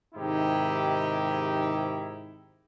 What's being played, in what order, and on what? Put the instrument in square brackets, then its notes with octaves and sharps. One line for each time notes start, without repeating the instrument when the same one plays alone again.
[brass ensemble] G#2 C3 D#3 D#4 E4 G4